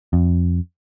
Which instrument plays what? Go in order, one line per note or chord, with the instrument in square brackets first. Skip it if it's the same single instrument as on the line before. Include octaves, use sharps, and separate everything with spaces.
[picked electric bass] F2